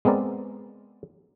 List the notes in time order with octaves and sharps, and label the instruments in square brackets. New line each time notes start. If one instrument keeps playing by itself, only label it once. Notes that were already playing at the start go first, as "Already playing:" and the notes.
[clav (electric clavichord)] G#3 B3 C4 A#4 D5